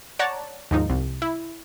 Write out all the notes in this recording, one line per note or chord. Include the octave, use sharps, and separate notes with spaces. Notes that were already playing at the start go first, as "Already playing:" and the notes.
C#5 D5 F#5 A5 A#5
D#2 G#2 F3 D#4
C2
E4